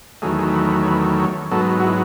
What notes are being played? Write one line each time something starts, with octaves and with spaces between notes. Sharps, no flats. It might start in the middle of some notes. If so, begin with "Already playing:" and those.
E2 D#3 F#3 A3 G#4
G#4
B4
B4
C#5
B4
C#5
G#2 F#3 B3 A4
F#4
E4